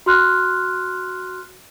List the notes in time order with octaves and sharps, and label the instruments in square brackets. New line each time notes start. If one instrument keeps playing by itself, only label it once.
[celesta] F#4 C6 F6 F#6